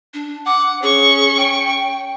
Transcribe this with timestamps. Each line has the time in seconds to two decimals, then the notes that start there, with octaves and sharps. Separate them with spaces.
0.14 D4
0.46 F#5 D6
0.83 C#4 G#4 C#6
1.37 G5